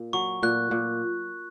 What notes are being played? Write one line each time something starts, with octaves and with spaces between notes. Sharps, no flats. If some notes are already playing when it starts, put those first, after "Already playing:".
Already playing: A#2
F#3 C#6
A#2 F#6
A#2